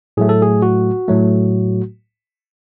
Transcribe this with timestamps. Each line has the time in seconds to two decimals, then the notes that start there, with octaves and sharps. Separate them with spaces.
0.17 A2 F#3 A3 G#4
0.29 A4
0.42 G#4
0.62 F#4
1.08 A2 F#3 A3